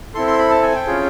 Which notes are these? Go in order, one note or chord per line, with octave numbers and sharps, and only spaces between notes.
C4 E4 A4 C6
C6
B5
A5
G#5
G5
C#4 F4 G#4